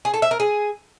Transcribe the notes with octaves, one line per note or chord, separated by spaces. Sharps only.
G#4
A4
E5
A#4
G#4